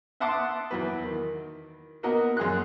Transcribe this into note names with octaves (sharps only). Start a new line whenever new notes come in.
E5 F#5 A5 C6 D6 D#6
E2 F#3 B4
D#3
A#3 B3 F#4 A#4 D#5
F#2 G#4 C6 F#6